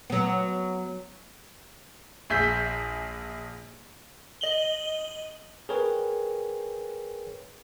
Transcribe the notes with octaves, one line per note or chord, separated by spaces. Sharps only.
F#3 B3
A#1 G#4 E5 G6 B6
D#5 F#7 G7
G#4 A#4 B4 C#5 G5